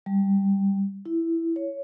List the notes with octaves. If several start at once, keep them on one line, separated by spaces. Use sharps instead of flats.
G3
E4
C#5